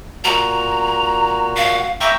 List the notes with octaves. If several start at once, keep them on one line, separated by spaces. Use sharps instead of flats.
A#2 F#4 A#5
F5
E5 G5 A#5 C#6